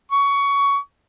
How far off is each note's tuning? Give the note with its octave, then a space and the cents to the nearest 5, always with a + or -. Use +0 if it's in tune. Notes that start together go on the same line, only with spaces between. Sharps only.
C#6 +20